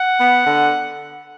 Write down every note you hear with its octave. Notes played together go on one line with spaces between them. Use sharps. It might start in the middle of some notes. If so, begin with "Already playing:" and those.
Already playing: F#5
B3
D3